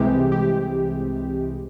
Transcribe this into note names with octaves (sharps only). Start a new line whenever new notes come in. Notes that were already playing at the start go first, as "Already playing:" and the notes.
Already playing: C2 C3 E3 G#3 G4
G4